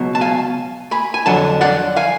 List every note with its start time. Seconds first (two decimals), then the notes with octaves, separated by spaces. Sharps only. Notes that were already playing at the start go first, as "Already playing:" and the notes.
Already playing: C#2 B2 F#3
0.15 A5
0.21 F5 G#5
0.91 G#5 B5
1.14 G#5
1.26 F2 D3 F#3 F#5 A5
1.61 D5 F#5
1.96 F5 G#5